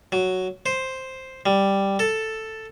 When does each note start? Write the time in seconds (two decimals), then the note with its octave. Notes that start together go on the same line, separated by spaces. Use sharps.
0.12 F#3
0.66 C5
1.46 G3
1.99 A4